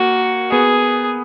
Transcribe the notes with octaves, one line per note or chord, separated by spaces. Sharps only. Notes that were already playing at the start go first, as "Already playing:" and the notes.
Already playing: A#3 F#4
B3 G#4